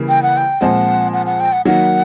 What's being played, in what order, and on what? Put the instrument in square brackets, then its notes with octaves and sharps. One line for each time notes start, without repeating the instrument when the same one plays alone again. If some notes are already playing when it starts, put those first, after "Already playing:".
Already playing: [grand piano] C#3 E3 G3 A#3
[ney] G5
F#5
G5
[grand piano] A#2 F3 G#3 C4 [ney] F#5
[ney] F#5
F#5
G5
F#5
[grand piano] D#3 F#3 A#3 [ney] F#5